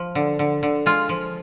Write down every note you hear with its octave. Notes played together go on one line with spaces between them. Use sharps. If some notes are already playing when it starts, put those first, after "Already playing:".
Already playing: F3
D3
D3
D3
G#3 F4
F3